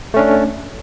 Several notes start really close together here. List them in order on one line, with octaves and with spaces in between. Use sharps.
A3 C#4 D4